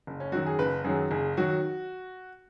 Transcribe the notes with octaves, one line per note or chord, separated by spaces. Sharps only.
F#1
C#4
F#2 D#3 F#3 F#4
G#4
F#1 B4
F#2 D#3 F#3 G#4
F#1 G#4
D#3 F#3 F#4